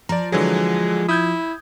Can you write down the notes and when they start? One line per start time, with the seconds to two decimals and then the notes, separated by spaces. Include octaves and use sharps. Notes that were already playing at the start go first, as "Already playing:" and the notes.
0.09 F3 D5 A#5
0.32 D3 E3 F#3 G#3
1.09 E4 D#6 G6 G#6